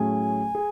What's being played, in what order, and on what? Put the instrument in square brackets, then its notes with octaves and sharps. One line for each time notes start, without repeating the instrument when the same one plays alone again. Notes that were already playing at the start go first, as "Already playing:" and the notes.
Already playing: [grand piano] A2 F#3 A3 C#4 G#4 [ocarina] G#5
[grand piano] G#4